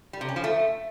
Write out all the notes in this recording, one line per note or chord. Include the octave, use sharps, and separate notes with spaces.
G3
C3
C#4
F3
A3